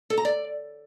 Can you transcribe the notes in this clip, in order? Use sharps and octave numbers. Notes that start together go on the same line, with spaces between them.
A4
A#5
D5